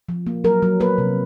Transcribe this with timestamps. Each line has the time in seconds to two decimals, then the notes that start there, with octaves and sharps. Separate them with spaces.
0.09 F3
0.27 A#3
0.44 F#3 A#4
0.62 F#3
0.80 A#3 B4
0.98 C3